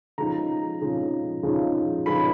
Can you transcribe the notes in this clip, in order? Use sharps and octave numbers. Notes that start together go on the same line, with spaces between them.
C#3 F3 G#3 D#4 A#5
C#3 F3 G#3 D#4
C#3 F3 G#3 D#4
C#3 F3 G#3 D#4 B5